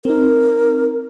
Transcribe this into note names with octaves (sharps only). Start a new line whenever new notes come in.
C4 D#4 A#4